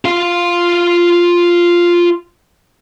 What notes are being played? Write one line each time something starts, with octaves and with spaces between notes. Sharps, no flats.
F4 F5